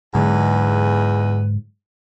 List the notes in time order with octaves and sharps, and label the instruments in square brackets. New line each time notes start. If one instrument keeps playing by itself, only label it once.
[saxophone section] E2 G#3 B4 [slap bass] G#2 D3 F#3